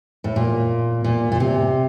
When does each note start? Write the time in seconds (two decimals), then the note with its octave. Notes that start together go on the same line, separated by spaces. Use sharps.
0.24 A2
0.36 A#2
1.04 A#2
1.32 A#2
1.40 C3